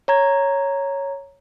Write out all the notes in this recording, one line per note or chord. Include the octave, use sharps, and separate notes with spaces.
C#5 A#5 G#6